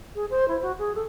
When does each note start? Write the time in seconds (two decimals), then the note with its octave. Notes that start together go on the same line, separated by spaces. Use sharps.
0.15 G#4
0.30 C5
0.48 E4
0.62 F#4
0.78 G#4
0.95 A4